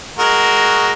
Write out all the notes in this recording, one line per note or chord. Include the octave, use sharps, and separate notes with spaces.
G#3 F#4 A#4